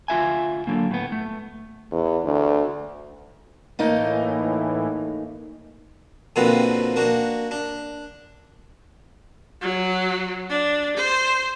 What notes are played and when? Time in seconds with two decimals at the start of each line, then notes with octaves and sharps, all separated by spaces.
0.08 D2 F4 E5 G#5
0.67 D3 F#3 A#3
0.91 A2 B3
1.12 A3
1.92 E2
2.24 D2
3.79 A2 E3 A3 A#3 D#4
6.36 B2 D3 F3 A#3 C4 B4
6.96 A#3 D4 F#4
7.51 D4
9.61 F#3
10.50 D4
10.97 C5